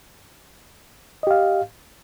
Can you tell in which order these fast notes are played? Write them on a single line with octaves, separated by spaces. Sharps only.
D#5 G4 F5